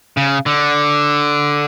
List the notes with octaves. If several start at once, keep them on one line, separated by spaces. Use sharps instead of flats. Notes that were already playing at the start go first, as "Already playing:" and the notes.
C#3
D3